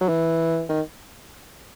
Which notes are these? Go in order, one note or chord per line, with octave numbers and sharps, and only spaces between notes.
F#3
E3
D#3